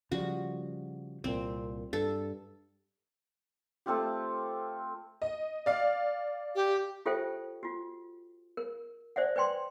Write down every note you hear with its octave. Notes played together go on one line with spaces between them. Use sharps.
C#3 F3 G3 F#4
C2 A#2 C4
G2 A4
A3 C4 F4 G4
D#5
D5 F5
G4
F4 G4 A4 C5 E5 G5
F4 F#4
A#4
C5 D5 E5 F#5
B4 D5 G5 C6